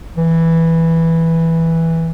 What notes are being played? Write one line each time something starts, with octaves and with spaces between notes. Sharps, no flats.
E3